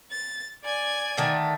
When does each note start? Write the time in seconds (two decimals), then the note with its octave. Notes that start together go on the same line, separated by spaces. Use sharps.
0.12 A6
0.63 D5 G#5 G#6
1.17 D3 D#3 A3